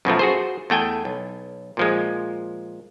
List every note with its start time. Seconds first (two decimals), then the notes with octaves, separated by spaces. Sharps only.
0.05 F#2 B2 F3 A3
0.19 F#4 G#4 C5
0.70 E2 A3 G5 G#5
1.05 B1
1.77 A#2 F3 G#3